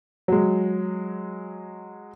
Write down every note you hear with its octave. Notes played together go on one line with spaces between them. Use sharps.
F#3 G#3